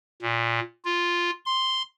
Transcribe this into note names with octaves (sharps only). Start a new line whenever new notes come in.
A#2
F4
C6